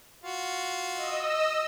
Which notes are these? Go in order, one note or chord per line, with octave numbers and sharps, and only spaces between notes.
F4 F#4
D#5 E6